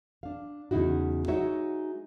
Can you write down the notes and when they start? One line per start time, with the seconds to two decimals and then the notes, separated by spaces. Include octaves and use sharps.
0.23 D4 F5
0.71 E2 C#3 D#4 E4 F#4
1.28 G#3 D#4 F#4 C#5 E5